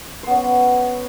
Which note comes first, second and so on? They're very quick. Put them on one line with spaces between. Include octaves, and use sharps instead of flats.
C5 B3 C#4